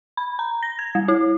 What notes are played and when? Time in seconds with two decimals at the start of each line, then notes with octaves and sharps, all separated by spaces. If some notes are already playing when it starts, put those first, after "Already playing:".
0.17 B5
0.39 A#5
0.63 A#6
0.79 G#6
0.95 G3
1.08 E4